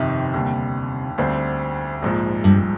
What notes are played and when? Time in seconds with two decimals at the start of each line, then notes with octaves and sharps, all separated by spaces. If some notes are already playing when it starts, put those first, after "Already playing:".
Already playing: G1 F2 C3 D#3
0.34 D#2 D3 G3
1.18 D2 D3 G3 C4
2.02 A#1 G#2 F3
2.44 G2